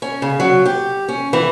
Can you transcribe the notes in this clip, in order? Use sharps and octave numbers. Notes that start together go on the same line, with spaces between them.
C#4
C#3
F#3
G4
C#4
E3